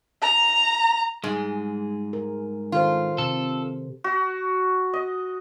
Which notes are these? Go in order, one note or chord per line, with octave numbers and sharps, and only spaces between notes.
A#5
G#2 G3 G#3
A#4
D#3 F4 A4 C5
C3 A4
F#4
D#5